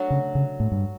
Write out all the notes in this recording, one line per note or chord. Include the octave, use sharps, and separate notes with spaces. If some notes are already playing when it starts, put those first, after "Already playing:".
Already playing: F#3 A3 D4 F#4
C#3
C#3
A2
G2